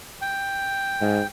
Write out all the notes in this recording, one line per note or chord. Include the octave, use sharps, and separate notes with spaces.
G5
G#2